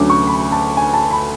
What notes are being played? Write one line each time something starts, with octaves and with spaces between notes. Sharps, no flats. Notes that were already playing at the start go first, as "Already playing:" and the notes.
Already playing: D2 D3 F#3 A3 C#4 D6
C#6
B5
A5
G#5
A5
B5